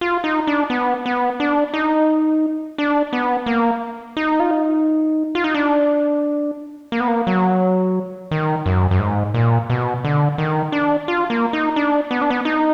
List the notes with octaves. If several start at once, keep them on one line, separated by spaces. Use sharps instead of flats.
F4
D#4
D4
B3
B3
D4
D#4
D4
B3
A#3
D#4
F4
D#4
F4
D#4
D4
A#3
B3
A#3
F#3
D#3
F#2
F#2
G#2
A#2
B2
D3
D#3
D4
F4
A#3
D#4
D4
B3
D4
B3
D#4